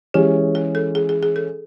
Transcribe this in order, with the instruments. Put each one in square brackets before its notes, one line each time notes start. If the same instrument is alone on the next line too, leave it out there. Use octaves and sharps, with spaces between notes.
[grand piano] E3 G#3 C#4 [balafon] G4
[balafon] G#4
A4
G#4
G#4
G#4
A4